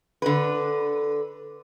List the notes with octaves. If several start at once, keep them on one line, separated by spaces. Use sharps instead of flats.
D3 B4